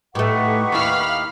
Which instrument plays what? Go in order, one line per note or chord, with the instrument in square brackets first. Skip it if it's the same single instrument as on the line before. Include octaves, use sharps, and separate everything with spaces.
[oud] A2 A3 [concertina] D#4 G4 [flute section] B4 F#5 C#6
[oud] D#2 E4 [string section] F5 B5 F6